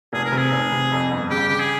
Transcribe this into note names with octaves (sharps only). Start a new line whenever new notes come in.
F1 G#4
A#4
C3 G#4
F1
C3
F2
G1
C#3 G4
C#3 G4
G#4